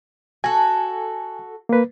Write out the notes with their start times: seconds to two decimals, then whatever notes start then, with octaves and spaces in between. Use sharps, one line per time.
0.44 F#4 A4 G#5
1.69 A#3 B4